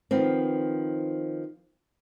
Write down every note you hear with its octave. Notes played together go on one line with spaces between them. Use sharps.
D#3 F3 B3 C4